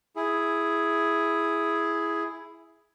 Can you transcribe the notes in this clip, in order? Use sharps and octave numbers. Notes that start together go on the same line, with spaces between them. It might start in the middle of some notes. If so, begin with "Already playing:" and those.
E4 G#4